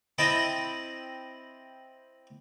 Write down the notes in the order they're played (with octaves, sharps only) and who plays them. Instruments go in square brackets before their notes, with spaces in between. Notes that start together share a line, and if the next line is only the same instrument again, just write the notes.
[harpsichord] C4 E4 D#5 G5 A5 B5